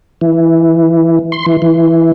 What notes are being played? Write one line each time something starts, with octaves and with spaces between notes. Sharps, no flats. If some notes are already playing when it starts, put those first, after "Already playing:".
E3
C6
E3
E3